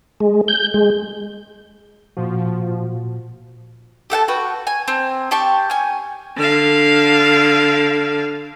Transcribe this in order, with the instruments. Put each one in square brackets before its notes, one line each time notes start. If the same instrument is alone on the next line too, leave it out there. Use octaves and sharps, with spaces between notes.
[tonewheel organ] G#3
G6
G#3
[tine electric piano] A#2 F#4 [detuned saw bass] F3
[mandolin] G4 A4 F#5 A5
F#4 B4 G5
G#5
C4
G4 G5 A5 C#6
C#4 G#5
[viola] D3 F5